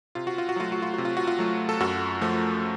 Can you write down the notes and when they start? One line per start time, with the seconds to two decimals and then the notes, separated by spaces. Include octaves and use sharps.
0.15 C3 F4
0.27 F#4
0.38 F4
0.49 F#4
0.56 F#3 A3 F4
0.72 F#4
0.82 F4
0.94 C3 F#4
1.05 F4
1.17 F#4
1.27 F4
1.39 F#3 A3
1.69 A4
1.80 F#2 F#4
2.21 F3 A3